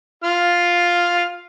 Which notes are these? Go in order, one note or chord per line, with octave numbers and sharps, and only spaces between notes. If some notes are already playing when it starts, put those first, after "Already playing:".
F4 F6